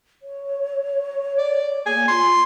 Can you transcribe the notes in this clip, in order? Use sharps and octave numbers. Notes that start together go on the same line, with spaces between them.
C#5
D5
A#3 G#5
F4 C6